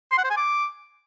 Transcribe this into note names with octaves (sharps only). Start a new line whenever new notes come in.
C6
F#5
C5
G#5
D6